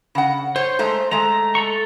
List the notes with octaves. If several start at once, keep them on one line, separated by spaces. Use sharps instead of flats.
C#3 F#5
C5 C#5
G#3 A3 A#5
G#3 A3 A#5
A4 A#5 C#6